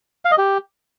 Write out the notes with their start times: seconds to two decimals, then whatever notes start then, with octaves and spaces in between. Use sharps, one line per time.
0.25 F5
0.31 D#5
0.38 G4